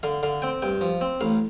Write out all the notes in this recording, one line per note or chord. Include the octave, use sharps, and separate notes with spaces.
D3 F5
D3 F5
C4 G5
G2 G5
F3
C4
A1 F5